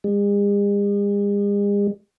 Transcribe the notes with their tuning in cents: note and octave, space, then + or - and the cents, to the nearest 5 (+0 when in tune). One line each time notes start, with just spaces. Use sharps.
G#3 -45